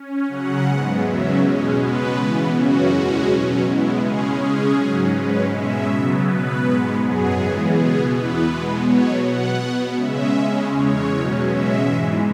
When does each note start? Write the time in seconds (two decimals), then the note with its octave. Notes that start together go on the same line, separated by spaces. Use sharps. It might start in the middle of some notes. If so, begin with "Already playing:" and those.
Already playing: C#4
0.28 C#3 F#3 C#4 F#5
0.67 G#2 G#3 B3
1.03 E2 C#3 F#3 C#4 E5
1.40 B2 G#3 C#4
1.78 B2 G#3 B3 B4
2.15 C#3 E3 B3
2.52 F#2 C#3 E3 C#4 F#4
2.89 E2 B2 G#3 C#4
3.26 B2 F#3 C#4
3.63 B2 G#3 B3 E4
4.00 C#3 G#3 C#4 G#4
4.37 C#3 G#3 C#4 G#4
4.75 G#2 F#3 C#4
5.11 G#2 G#3 C#4 B4
5.49 B2 G#3 C#4 E5
5.86 C#3 F#3 B3
6.23 B2 B3 B4
6.61 G#2 G#3 B3
6.98 F#2 F#3 B3 G#4
7.34 C#3 E3 G#3 B3
7.72 B2 B3 G#4
8.09 E2 E3 B3 B4
8.46 B2 G#3 B3
8.83 B2 F#3 B3 C#5
9.20 B2 B3 F#5
9.58 B2 B3
9.95 C#3 G#3 C#4 E5
10.32 C#3 G#3 C#4
10.69 E2 C#3 G#3 C#5
11.07 E2 B2 F#3 C#4
11.43 B2 G#3 C#4 E5
11.81 G#2 E3 G#3